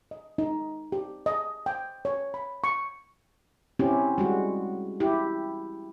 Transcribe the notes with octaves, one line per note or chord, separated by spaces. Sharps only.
D#5
D#4
G4
D#5
G5
C#5
B5
C#6
C4 C#4 E4 G4
G3 G#3 F#4
E4 G4